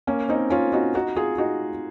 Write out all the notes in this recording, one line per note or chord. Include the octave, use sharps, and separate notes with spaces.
A#3 C#4
C4 D#4
C#4 F4
D#4 F#4
D#4 F#4
F4 G#4
D#4 F#4